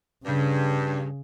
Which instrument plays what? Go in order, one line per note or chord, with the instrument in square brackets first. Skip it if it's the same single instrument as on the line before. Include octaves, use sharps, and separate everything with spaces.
[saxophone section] G2 [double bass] C#3